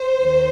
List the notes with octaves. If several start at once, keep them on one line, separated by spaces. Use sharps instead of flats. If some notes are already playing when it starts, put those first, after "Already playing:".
Already playing: C5
D#2 D#3